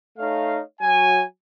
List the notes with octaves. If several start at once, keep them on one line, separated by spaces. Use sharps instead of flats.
A3 D#4 C#5 F5
F#3 G#5